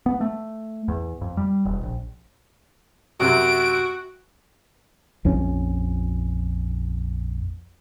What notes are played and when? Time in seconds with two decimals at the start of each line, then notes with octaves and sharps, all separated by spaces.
0.06 B3
0.21 A3
0.88 E2
1.21 F2
1.37 G3
1.65 E1
1.83 A#1
3.20 F#2 C3 F#4 D7
5.25 A#1 F2 C#4